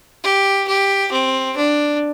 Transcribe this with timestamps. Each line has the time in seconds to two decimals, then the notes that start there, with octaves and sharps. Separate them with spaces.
0.24 G4
0.67 G4
1.12 C4
1.57 D4